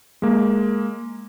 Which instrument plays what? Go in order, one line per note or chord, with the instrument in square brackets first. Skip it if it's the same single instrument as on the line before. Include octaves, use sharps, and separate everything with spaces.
[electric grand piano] G#3 A#3